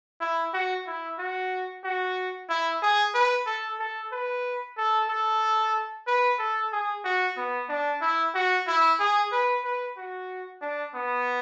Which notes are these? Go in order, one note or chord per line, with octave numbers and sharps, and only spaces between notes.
E4
F#4
E4
F#4
F#4
E4
G#4
B4
A4
A4
B4
A4
A4
B4
A4
G#4
F#4
B3
D4
E4
F#4
E4
G#4
B4
B4
F#4
D4
B3